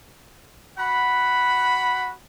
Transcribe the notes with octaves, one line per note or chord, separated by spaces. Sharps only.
F#4 F#5 B5